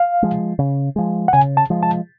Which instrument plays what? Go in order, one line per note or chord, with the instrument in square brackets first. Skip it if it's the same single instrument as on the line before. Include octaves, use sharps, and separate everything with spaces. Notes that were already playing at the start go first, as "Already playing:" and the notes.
Already playing: [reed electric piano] F5
[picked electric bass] F3 G#3
C#3
F3 G#3
[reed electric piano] F#5
[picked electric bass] C#3 [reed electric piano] G#5
[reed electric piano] A5
[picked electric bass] F3 G#3
[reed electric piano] A5